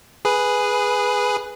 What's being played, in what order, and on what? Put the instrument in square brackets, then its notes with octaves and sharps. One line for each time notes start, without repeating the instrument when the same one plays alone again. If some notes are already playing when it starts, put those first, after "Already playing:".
[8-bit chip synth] G#4 B4